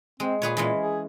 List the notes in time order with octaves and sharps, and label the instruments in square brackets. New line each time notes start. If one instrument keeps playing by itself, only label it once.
[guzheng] G#3 [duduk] C4
[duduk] A#2 [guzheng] G#4 B4 C#5
[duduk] A#2 [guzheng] E3 G#3 C#4
[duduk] G#4